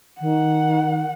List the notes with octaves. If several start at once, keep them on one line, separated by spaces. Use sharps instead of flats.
D#3 F#5